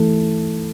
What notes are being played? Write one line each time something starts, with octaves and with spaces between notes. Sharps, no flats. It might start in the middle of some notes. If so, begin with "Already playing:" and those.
Already playing: E3 A3